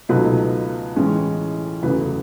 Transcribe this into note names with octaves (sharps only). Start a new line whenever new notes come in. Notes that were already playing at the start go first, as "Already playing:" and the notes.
C#2 B2 F#3 A3 D#4 B4
A1 A2 G#3 C#4
F#1 E2 C#3 F#3 A3 B4